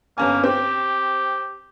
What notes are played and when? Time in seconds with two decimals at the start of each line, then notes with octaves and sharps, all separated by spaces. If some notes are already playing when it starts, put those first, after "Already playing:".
0.18 G1 A#3 C#4 G#5
0.44 C4 G4